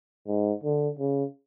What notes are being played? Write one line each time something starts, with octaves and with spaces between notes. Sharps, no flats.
G#2
D3
C#3